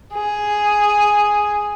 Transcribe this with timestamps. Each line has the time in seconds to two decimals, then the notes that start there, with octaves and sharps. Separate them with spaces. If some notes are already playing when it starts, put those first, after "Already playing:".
0.13 G#4